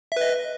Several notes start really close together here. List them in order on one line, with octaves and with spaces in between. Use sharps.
E5 B4 D#5